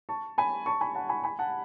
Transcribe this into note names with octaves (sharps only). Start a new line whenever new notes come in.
A5 C#6
G#5 B5
A5 C#6
G#5 B5
F#5 A5
G#5 B5
G#5 B5
F#5 A5